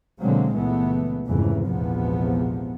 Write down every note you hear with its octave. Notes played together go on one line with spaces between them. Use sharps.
B2 D3 F#3 G#3 A#3 C4
C#2 A#2 E3 A3 B3
F1 F2 G#2 C#3 E3
A#1 E2 G#2 C3 F3 B3